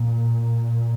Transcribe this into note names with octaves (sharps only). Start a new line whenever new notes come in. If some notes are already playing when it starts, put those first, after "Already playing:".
Already playing: A#2